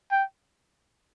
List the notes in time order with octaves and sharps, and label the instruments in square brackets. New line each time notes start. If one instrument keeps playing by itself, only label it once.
[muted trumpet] G5